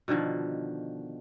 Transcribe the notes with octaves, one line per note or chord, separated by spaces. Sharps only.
B2 D3 D#3 F3